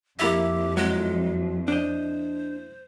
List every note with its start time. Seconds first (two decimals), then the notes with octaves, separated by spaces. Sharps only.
0.19 F2 A#3 E4 G4 E5
0.77 F#3 G#3
1.68 D4 C5 D#5